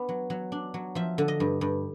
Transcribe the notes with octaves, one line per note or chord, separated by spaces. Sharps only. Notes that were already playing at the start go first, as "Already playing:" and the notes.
Already playing: B3 D4
F#3
F#3
D4
F#3
F3 E5
D3
D#5
G2
G2